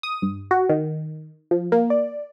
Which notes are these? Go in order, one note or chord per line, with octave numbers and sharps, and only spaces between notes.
D#6
G2
F#4
D#3
F3
A#3
D5